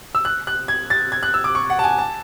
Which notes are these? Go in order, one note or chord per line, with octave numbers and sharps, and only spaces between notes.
E6
F#6
F#6
G#6
A6
G#6
F#6
E6
D6
C#6
F#5
A5
G#5
A5